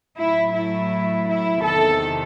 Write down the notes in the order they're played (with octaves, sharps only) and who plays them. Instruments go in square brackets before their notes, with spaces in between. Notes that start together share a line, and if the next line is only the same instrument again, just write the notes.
[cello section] A2 F#3 A3 E4
E4
E4
E2 C3 D#3 A4